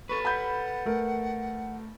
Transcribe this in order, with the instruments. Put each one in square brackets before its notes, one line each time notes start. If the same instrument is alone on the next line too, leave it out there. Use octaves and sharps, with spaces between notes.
[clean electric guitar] A4 B4 [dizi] C#6
[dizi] F#5 [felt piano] B5 G6
[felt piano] A3 A#4